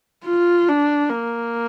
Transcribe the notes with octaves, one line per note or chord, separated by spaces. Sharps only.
F4
D4
A#3